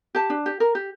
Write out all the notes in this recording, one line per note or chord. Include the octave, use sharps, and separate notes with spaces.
G4 A5
D4
G4
A#4
G4